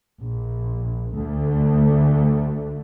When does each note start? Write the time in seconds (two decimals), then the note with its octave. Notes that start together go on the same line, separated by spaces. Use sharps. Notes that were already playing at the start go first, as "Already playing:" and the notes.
0.22 A#1
1.16 D2 D3 A3